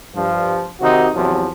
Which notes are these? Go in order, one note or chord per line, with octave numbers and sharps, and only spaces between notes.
G2 F3
C3 D#3 D#4 F#4
E2 C3 F3 F#3